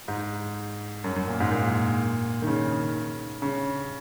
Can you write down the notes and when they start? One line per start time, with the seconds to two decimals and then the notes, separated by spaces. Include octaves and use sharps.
0.08 G#2
1.04 F#2
1.16 F#2
1.28 A#2
1.40 G#2
1.52 A#2
2.42 D#3
2.47 C#3
3.42 C#3